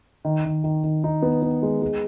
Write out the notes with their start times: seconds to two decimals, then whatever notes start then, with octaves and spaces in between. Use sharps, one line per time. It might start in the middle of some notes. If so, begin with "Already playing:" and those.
0.25 D#3
0.45 D#3
0.64 D#3
0.84 D#3
1.04 D#4
1.22 B3
1.42 B3
1.63 G#3
1.82 G#3